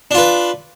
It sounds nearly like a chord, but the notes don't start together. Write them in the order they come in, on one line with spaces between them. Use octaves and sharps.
D4 F4 B4